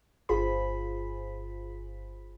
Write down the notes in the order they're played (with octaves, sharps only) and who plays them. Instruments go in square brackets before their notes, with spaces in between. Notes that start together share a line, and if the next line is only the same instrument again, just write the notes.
[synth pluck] G1 F4 G#4 C5 B5